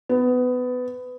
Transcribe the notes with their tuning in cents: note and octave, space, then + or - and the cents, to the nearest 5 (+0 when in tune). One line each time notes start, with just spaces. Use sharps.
B3 +20